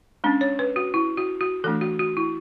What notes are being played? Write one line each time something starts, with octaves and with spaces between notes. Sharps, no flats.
G#3 C#4 D4
C#5
B4
F#4
E4
F#4
F#4
E3 A3 D4 A4
F#4
F#4
E4